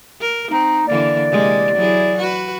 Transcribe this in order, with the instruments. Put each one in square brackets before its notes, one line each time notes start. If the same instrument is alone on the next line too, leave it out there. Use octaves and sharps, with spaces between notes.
[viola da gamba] A#4
[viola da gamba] C4 [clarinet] D#4
[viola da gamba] D3 E3 A#3 [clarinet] D5
[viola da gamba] C3 G#3 A#3
F#3 E4 G#4
F#4 B4